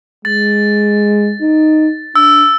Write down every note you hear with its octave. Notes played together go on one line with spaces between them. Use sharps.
G#3 A6
D#4
D4 E6